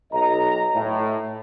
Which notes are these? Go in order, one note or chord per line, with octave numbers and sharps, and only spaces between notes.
B1 D#5 A#5
A2